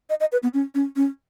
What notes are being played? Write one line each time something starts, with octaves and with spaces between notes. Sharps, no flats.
D#5
D#5
B4
B3
C#4
C#4
C#4